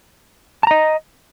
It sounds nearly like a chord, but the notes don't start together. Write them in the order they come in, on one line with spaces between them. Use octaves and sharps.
A5 A#5 D#5